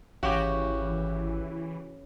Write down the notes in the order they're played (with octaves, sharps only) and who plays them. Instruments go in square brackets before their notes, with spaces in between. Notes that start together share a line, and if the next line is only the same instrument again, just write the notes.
[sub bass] G#1 [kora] C#3 [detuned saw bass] E3 [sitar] F#4 G4